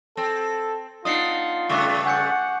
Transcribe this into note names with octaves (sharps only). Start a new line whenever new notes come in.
C4 A4
B3 D4 D#4 F4 D#6 C7 C#7
G2 C#3 A3 C#6 D6 F#6
F#5 G#5 G6 C#7